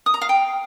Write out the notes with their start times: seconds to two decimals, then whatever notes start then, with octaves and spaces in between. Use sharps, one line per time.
0.06 D#6
0.14 A#5
0.21 F5
0.29 G5